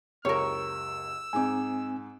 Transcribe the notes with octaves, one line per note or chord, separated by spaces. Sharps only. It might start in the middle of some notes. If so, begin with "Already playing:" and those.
F#1 C#2 G4 A#4 C#5 E6
G#2 C4 D#4 G#5 D6